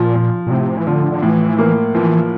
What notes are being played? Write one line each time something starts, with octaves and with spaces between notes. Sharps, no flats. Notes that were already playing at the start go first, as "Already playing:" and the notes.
Already playing: A#2 F3
F3
A#2
A2 C3
E3
D3 F3
D3
A2 E3
A#3
E3 F3